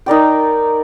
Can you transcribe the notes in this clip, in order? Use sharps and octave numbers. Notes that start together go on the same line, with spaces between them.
D#4 A#4 D5 G5